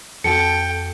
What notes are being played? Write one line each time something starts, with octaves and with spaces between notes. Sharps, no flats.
F2 F#4 A4 G5 C#7